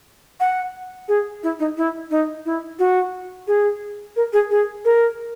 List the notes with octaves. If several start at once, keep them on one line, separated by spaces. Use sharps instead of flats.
F#5
G#4
E4
D#4
E4
D#4
E4
F#4
G#4
A#4
G#4
G#4
A#4